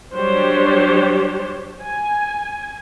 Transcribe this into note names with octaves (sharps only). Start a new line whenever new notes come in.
F#3 G3 D4 G4 C5 C#5
G#5